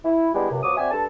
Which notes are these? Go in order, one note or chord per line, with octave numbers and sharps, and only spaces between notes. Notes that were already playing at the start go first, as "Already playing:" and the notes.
E4
G3 G#3 B3 D4 E4 G4
C#2 F#2 C3
B2 F3 F#3 D6 D#6
C4 F#4 D5 E5 G#5
G2 A4 A5